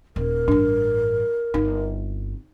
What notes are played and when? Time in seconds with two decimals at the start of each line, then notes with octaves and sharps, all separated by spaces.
0.16 D#1 A#4
0.48 A1 G2 D4
1.54 G1 C4 D#4